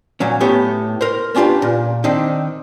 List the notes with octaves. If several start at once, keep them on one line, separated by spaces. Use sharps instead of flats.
A#2 F#3 C#4
A2 B3 G4 C#5
A#4 C5
B3 C#4 D4 F4 G4 B4
A#2
D#3 C4 D4 D#4